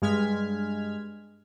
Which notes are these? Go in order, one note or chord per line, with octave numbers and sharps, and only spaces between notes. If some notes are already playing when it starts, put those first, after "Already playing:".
G2 G#3 F6 G#6 B6